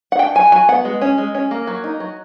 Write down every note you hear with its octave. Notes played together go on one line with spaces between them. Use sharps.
F#5
D4 G5
F#3 G#5
F#3 G#5
B3 F#5
G#3
C#4
G#3
C#4
A#3
F#3
D#4
F#3